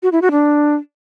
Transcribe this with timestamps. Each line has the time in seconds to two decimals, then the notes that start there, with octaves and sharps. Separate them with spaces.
0.03 F#4
0.12 E4
0.22 F#4
0.31 D4